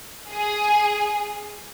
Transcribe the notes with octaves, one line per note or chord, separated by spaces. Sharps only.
G#4